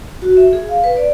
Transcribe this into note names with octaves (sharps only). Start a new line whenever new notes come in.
F#4
E5
G#4
F5
B4
D5